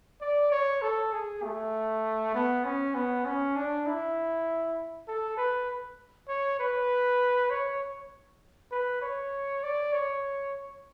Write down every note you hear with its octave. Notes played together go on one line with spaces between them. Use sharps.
D5
C#5
A4
G#4
A3
B3
C#4
B3
C#4
D4
E4
A4
B4
C#5
B4
C#5
B4
C#5
D5
C#5